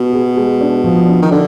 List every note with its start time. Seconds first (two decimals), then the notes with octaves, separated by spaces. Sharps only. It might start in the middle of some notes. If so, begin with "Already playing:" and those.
Already playing: B2
0.13 G#4
0.37 G#3
0.61 D4
0.84 F3
1.08 D4
1.22 D#3
1.31 D3 D4